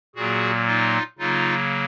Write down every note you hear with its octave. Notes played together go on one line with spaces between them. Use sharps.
A#2 F#3 A#3 F#4 G#4
D#4 F4
C#3 F#3 A#3 D#4 F4